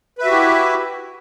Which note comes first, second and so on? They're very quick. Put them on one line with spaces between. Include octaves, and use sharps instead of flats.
B4 E5 F#4 G4 E4